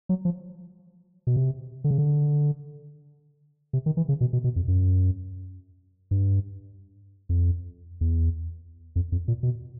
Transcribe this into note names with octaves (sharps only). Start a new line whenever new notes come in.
F#3
F3
B2
C3
D3
C#3
D3
C3
D#3
E3
C#3
B2
B2
B2
F2
F#2
G2
F2
E2
F2
F2
A#2
B2